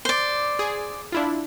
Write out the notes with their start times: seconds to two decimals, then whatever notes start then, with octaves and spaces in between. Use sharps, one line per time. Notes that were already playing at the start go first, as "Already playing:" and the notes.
0.05 C5 D5
0.59 G#4
1.12 D4 E4 F4